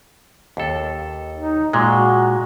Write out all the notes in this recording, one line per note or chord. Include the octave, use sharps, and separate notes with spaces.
D#2 A4
D#4
A#2 G#3 F#4